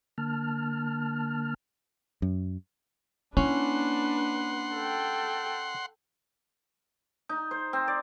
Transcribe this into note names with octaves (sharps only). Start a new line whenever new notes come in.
D3 A#3 A5 F6
F#2
A#3 C#4 D4 E4 B4 F#5 C6
A4 G5
D#4
C5
C4
D5